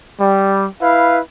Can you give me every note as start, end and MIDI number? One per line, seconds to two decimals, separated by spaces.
0.19 0.66 55
0.81 1.19 64
0.81 1.19 71
0.81 1.19 77